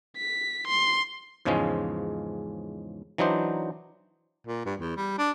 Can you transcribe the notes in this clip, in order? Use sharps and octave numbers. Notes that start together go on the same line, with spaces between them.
B6
C6
E2 G#2 C#3 F3 G#3 C#4
E3 F#3 D4 D#4 C5
A#2
G2
E2
G3
D4